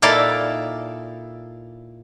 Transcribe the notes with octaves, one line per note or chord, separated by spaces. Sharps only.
A#2 D#4 E4 A4 D5 F5